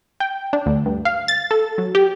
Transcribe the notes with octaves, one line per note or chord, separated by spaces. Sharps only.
G5
D4
D2
G2
F5
A6
A4
F#3
G4